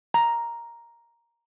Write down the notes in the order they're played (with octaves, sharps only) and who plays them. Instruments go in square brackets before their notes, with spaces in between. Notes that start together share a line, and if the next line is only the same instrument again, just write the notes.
[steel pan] A#5